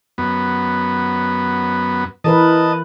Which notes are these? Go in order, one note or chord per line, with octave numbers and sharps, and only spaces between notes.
F#2 B3
E3 A#4 B4 D#5 A5